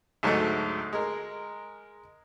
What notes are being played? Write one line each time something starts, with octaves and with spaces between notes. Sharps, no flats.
D2 G#2 F#3 G#3 A3
G#3 A#4